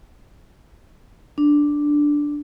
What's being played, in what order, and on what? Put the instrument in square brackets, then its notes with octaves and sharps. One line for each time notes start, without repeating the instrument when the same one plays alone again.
[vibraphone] D4